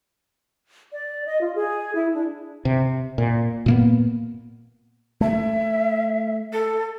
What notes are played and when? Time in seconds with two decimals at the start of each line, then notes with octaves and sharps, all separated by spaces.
0.92 D5
1.26 D#5
1.41 F4
1.54 G#4
1.95 E4
2.13 D4
2.65 C3
3.18 A#2
3.66 A#2 A#3 B3
5.21 A3 E5
6.53 A4